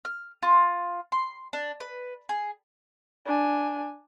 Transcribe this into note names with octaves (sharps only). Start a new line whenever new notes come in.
F6
F4
C6
D4
B4
G#4
D4 G#5